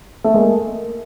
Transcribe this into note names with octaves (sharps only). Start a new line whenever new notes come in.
A3
G#3 A#3